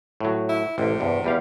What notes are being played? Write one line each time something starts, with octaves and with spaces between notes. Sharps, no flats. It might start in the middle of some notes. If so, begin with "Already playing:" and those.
A2 F#3
E4
A1 C3
E2 G2
E2 G3 F5